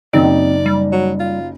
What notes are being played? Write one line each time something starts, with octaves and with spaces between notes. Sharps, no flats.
F#1 C4 D#4 D5
G3
F#3
F4